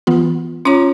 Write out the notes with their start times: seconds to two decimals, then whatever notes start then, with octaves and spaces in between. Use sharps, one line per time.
0.07 E3 B3 F4
0.65 C#4 F4 C#5 A#5 D6